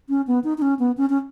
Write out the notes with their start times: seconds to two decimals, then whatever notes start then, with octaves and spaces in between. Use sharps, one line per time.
0.09 C#4
0.27 B3
0.44 D#4
0.58 D#4
0.62 C#4
0.79 B3
0.97 C#4
1.10 C#4